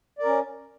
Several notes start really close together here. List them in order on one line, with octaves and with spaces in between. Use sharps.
D5 A#4 C#4